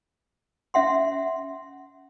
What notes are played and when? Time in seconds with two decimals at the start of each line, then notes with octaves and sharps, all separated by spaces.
0.74 C#4 E5 F#5 C6